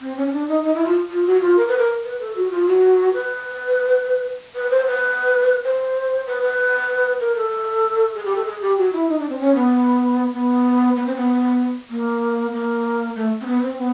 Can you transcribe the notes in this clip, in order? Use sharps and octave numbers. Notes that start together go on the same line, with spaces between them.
C4
C#4
C#4
D4
D#4
D#4
E4
F4
F4
F#4
F4
A#4
B4
A#4
B4
A4
F#4
F4
F#4
B4
B4
C5
B4
C5
B4
B4
A#4
A4
G#4
G4
A4
G#4
G4
F#4
E4
D#4
D4
C4
C#4
B3
B3
B3
C4
B3
A#3
A#3
A3
C4
B3
C4
B3